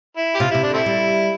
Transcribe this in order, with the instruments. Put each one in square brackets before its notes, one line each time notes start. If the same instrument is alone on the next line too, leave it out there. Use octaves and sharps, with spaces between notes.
[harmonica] E4
G4
[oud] C3 [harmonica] F4
[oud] C3 [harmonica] E4
[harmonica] D4
[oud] D3
[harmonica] A3 C4 E4
[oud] G3